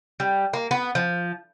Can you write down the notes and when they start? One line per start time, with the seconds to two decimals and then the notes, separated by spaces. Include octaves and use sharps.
0.20 G3
0.53 A#3
0.71 B3
0.95 F3